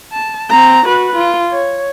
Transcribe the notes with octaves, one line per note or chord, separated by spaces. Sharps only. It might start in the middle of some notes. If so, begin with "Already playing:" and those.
A5
C4 A#5
F#4 B4
F4
C#5